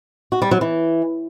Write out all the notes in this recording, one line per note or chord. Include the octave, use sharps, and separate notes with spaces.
F#4
G3
F#3
E3